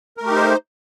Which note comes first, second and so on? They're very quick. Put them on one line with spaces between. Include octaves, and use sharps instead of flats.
A#4 A3 G4 D#4 C5